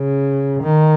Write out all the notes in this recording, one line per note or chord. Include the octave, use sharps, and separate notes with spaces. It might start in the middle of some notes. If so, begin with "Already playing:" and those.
Already playing: C#3
D#3